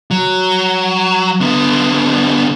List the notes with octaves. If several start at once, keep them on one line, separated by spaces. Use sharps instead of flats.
F#3
D3 B3